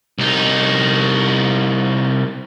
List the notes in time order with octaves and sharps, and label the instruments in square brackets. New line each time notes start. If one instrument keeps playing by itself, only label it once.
[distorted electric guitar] C2 D#4